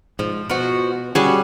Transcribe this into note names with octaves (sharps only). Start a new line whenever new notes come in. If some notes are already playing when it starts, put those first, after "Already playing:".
G#2 F3
B2 F3 F#4
G3 C#4 F#4 G#4